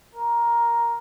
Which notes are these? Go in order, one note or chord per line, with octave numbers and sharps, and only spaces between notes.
A#4